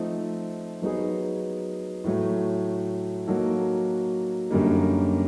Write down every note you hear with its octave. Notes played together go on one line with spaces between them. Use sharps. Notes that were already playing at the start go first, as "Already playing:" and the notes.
Already playing: F3 A3 C4 D#4
F#3 B3 D#4 G#4
A2 F#3 A3
F#3 A#3 D#4 F#4 A4
F#2 D3 G3 A#3 D#4